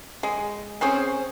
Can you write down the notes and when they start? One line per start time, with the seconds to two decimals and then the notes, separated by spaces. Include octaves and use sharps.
0.23 G#3
0.81 C4 C#4 G#4 C5